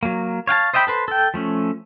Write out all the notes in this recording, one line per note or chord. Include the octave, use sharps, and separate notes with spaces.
F#3 A#3
C#5 F5 G5 A5
C5 D#5 E5 G5 B5
A4 B4 C5
A4 G5
F3 A3 C#4